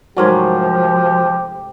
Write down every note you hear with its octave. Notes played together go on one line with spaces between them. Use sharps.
G#2 C3 F3 F#3 A3 G4 A#4 C#5